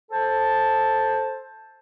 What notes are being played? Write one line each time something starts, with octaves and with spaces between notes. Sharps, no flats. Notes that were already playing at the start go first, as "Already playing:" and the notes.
A4 C5 A5